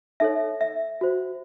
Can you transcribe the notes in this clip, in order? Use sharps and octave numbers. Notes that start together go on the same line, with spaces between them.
D#4 A4 C#5 E5
E5
F#4 C5